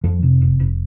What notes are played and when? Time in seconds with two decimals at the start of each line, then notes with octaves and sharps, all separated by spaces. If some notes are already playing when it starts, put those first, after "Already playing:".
0.04 F2 F3
0.23 C3
0.41 F1
0.60 F1